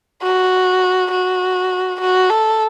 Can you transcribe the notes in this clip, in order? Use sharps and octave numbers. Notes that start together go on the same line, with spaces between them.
F#4
F#4
F#4
A4